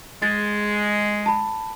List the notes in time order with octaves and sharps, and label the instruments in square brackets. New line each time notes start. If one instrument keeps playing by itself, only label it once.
[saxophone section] G#3 [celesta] A6
[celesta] A5 B5